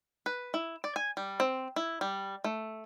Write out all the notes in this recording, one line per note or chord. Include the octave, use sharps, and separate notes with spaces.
B4
E4
D5
G#5
G3
C4
E4
G3
A3